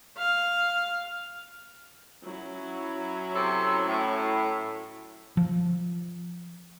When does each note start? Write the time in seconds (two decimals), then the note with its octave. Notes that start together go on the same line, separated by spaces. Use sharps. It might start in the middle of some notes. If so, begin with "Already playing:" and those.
0.18 F5
2.25 F#3 C#4 E4
3.35 C3 C4 A4
3.87 A2
5.37 F3